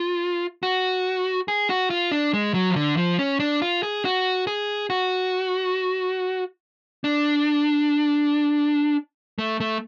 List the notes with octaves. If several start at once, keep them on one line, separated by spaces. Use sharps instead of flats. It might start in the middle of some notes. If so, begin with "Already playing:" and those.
Already playing: F4
F#4
G#4
F#4
F4
D4
G#3
F#3
F3
D3
F3
C#4
D4
F4
G#4
F#4
G#4
F#4
D4
A3
A3